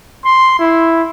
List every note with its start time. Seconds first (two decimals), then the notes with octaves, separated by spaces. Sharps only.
0.25 C6
0.59 E4